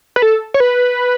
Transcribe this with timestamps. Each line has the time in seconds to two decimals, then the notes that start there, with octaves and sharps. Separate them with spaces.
0.16 B4
0.22 A4
0.54 C#5
0.60 B4